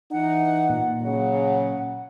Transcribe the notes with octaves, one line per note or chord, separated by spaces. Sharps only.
E3 D#4 F#5
A#2
C#3 F#3 F#5